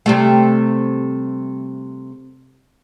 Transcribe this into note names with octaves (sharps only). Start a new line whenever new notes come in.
C3 G3 A3